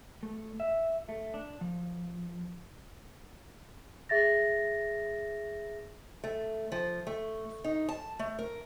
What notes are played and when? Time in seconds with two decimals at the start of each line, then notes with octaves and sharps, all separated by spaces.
0.23 A3
0.60 E5
1.09 A3
1.34 D4
1.61 F3
4.09 G#4 E5 A6 A#6
6.24 A3
6.72 F3
7.07 A3
7.64 D#4
7.89 A5
8.19 A3
8.39 A#4